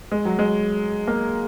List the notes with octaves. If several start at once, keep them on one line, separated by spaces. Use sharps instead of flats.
G#3
F#3
G#3
A#3